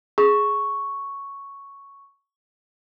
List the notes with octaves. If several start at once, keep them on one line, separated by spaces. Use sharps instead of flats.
G#4 C#6